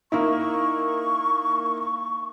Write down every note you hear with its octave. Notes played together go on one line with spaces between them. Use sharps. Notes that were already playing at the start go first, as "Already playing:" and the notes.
A#3 D#4 E4 C#6